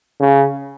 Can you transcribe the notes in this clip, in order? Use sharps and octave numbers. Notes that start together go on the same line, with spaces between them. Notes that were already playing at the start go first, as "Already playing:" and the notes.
C#3